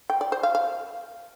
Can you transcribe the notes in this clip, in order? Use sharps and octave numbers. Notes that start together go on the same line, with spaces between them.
G5
D5
C5
F5
F5